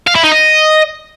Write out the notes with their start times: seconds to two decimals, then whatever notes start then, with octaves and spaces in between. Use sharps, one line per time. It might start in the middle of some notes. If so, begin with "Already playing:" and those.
0.07 F5
0.16 E4
0.24 D#4
0.32 D#5